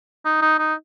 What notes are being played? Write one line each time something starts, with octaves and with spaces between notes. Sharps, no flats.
D#4
D#4
D#4